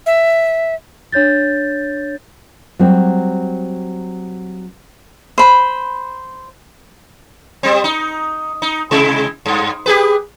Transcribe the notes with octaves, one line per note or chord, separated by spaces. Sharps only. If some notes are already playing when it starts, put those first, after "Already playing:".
E5
D4 C#5 G6 A6
F#3 G3 C4
C5 B5
G3 C4
D#4
D#4
C3 G#3 E4
G2
G4 G#4 B4